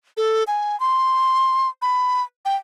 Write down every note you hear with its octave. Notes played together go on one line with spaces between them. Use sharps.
A4
G#5
C6
B5
G5